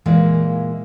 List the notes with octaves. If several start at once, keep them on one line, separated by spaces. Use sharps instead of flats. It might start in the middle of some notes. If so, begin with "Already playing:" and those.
A#2 E3 G#3 A#3